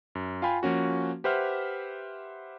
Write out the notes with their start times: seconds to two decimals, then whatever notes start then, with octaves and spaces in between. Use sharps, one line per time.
0.15 F#2
0.42 F4 F5 G5 G#5 B5
0.63 F3 A#3 C#4 F#4
1.24 G4 B4 C5 E5 F#5 F6